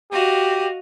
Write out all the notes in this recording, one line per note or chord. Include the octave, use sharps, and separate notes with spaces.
F#4 G4 D#5 F5